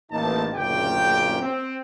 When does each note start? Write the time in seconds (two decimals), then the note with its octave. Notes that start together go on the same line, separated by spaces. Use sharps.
0.12 A1 A#3 D#4 A5
0.54 F#1 D2 A#2 C#3 G4 G5
1.41 C4